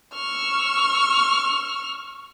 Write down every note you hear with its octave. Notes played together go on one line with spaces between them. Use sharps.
C#6 E6 F6